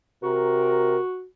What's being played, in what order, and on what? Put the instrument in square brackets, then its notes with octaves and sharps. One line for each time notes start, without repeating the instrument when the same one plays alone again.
[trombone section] C3 A#4 [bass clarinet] F#4